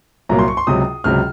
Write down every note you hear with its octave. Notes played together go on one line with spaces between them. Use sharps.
C2 A#2 F#3 A#3 A#5
C6
C#6
C6
C#2 C3 F#3 D#6
C#2 C3 F#3 F6